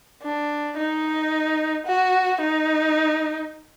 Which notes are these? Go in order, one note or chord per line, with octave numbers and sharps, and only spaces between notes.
D4
D#4
F#4
D#4